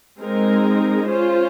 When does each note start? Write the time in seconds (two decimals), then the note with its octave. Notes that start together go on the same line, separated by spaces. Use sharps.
0.20 G#3 C4 D#4 A#4
1.08 C#4 F4 C5